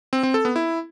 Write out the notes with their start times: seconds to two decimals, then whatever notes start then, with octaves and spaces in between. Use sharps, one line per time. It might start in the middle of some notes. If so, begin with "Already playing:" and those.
0.13 C4
0.23 C4
0.34 A4
0.45 B3
0.56 E4